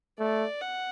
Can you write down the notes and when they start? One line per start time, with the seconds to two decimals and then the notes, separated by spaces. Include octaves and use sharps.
0.20 A3 D5
0.61 F#5